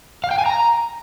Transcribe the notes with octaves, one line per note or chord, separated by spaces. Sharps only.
F5
G5
G#5
A#5